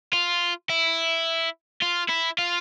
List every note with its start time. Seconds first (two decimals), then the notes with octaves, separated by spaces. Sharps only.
0.13 F4
0.70 E4
1.82 F4
2.09 E4
2.39 F4